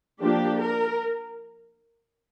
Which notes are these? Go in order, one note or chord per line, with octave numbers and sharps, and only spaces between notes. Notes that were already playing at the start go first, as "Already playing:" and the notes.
F3 A#3 D4 G4
A#4